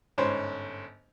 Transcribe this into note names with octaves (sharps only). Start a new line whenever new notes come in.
G1 G#2 C#4 C5 B5